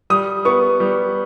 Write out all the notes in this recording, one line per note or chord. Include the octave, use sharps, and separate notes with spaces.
G3 D#6
B3 C#6
G3